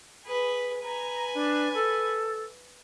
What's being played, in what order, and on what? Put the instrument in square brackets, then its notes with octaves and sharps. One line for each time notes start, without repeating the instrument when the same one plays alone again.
[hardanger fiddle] G#4 B4
[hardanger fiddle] B4 G#5 [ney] A#5
[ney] D4
A4